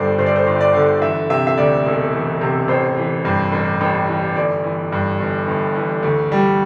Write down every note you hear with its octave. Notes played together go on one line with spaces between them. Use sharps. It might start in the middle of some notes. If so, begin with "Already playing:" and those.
Already playing: G1 G2 D3 C5 D5
G1 C5
D5
C5
G1
D5
D3
E3 E5
C3 E5
E5
D2 D5
E1
E3
C3
A1 C5
E3
G2
A1
A1
E3
G1 D5
E3
G2
G1
G1
E3
D2
G3